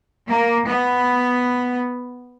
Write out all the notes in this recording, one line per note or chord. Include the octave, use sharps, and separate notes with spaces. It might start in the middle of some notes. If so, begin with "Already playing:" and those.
A#3
B3